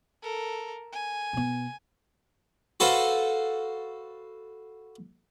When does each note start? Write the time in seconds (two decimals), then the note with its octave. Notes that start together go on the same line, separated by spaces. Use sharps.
0.22 A4 A#4
0.93 G#5
1.33 B2 B3
2.80 F#4 A4 B4 C5 F5